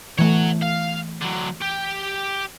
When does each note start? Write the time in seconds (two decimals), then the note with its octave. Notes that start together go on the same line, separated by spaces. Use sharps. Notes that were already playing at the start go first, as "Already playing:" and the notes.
0.19 E3 A3 C#5 F#5
0.63 F5
1.22 D3 F#3
1.62 G4